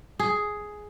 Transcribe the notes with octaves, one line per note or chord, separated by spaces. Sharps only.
G#4